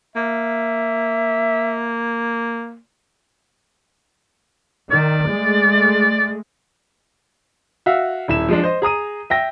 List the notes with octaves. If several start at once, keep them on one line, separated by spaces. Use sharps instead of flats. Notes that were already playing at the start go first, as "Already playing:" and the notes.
A#3 E5
D#3 D5
G#3 A3
F#4 E5 F5
D#1 E4 E7
F3 G#3 D4
C5 D#5
G#4 A#5 D#6 D#7
E5 G5 A#6